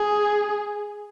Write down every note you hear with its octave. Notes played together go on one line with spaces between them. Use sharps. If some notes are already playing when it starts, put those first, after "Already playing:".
Already playing: G#4